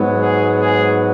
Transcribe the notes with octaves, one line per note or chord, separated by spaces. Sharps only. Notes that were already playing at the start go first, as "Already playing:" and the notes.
Already playing: G#2 F#3 B3
G#4
G#4